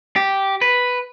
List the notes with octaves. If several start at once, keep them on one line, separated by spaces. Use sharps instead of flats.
G4
B4